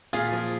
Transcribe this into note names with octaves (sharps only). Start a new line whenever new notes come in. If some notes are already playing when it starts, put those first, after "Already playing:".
A#2 F4 G#4
F3